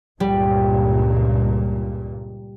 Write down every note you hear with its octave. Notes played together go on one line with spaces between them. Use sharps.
C#2 G2 A#2 G3